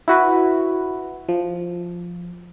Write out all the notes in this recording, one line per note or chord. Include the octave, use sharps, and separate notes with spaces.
E4 F#4 B4
F3